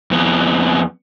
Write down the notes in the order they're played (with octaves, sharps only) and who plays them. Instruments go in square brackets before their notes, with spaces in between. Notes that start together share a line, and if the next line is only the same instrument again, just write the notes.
[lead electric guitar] F2 B3